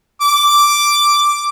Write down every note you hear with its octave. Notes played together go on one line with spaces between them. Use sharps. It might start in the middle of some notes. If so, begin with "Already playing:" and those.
D6